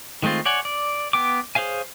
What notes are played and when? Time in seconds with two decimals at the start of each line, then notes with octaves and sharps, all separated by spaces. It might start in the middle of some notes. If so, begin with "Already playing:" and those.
0.23 D#3 G#3 A3 C4 F4
0.45 C#5 D5 F#5 G#5
0.65 D5
1.13 B3 G5 D6
1.55 G#4 C5 C#5 F5 G#5